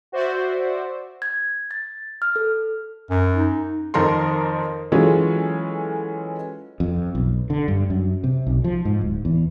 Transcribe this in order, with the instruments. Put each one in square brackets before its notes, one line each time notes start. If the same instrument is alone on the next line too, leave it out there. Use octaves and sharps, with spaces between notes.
[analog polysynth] F#4 C5 D5 E5
[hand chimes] G#6
A6
F6
A4
[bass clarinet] F#2
[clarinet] D#4
[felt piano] F2 D#3 A#4 A5 C6
E3 F#3 G#3 C#4 F4 A4
[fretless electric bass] F2
B1
D3
G2
F#2
C3
B1
F3
G#2
D1
E2